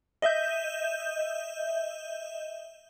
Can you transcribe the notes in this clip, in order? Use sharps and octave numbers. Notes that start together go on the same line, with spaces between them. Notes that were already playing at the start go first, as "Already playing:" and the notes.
D#5 E5 G6